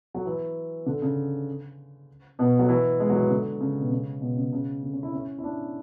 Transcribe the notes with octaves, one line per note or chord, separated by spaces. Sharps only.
F#3
E3
D3
C#3
B2
F#3
E3
G#3
F#3
E3
D3
C#3
B2
C#3
B2
C#3
C#3
D3
C#4
E4
C#4
E4
D4